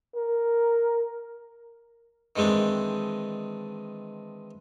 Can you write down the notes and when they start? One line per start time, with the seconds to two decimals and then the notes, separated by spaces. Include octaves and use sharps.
0.16 A#4
2.36 D#3 E3 G#3 C4 D4